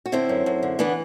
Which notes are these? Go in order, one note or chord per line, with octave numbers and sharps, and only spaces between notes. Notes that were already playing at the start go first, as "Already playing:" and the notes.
F#4
D3 C4 E4
F#2
F#2
D3
E3 B3 D4